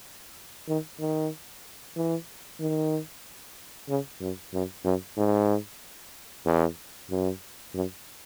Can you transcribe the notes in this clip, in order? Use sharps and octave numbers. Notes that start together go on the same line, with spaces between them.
D#3
D#3
E3
D#3
C#3
F#2
F#2
F#2
G#2
E2
F#2
F#2